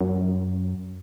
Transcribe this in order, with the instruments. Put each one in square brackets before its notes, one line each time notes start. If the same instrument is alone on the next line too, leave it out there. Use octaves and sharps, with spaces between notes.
[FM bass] F#2